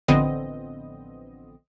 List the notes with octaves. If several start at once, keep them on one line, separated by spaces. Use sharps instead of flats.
A1 D3 F3 B3 C4 D#5